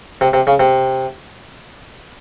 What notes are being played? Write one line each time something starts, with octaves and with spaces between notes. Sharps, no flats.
C3
C3
C#3
C3